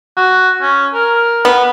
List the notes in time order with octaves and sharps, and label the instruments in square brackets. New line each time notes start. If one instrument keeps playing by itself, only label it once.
[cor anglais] F#4
C#4
A#4
[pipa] B3